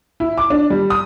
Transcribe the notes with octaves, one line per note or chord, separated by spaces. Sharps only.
E4
D6
D4
G3
D#6